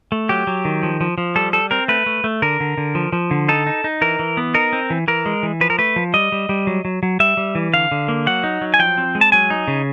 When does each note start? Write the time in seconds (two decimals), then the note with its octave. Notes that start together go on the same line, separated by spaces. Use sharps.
0.12 A3
0.29 F#3 G4
0.47 F#3
0.65 D#3
0.83 F3
1.01 F3
1.18 F3
1.36 G3 A4
1.53 G3 A4
1.71 C4 A#4
1.88 A3 B4
2.06 A3
2.24 A3
2.42 D3 A#4
2.60 D3
2.78 D3
2.95 F3
3.13 F3
3.31 D3
3.49 D#4 A4
3.66 D#4
3.84 D#4
4.01 E3 A#4
4.19 E3
4.37 B3
4.54 D#4 A#4
4.73 C4
4.90 E3
5.08 E3 A#4
5.26 G#3
5.43 E3
5.61 F3 B4
5.70 A#4
5.78 A3 B4
5.96 F3
6.14 G3 D#5
6.32 G3
6.49 G3
6.67 F#3
6.85 F#3
7.03 F#3
7.20 G3 E5
7.37 G3
7.55 E3
7.73 D3 F5
7.92 D3
8.08 A#3
8.27 F#3 F#5
8.44 D#4
8.61 F#3
8.74 G#5
8.79 F3 G5
8.98 C4
9.15 G#3
9.21 A5
9.32 F#3 G#5
9.50 D#4
9.68 C#3